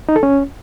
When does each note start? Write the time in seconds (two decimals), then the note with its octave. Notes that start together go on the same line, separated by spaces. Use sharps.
0.09 D#4
0.16 A4
0.23 C#4